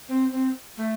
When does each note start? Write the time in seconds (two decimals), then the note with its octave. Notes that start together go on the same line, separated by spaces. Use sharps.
0.09 C4
0.32 C4
0.77 A3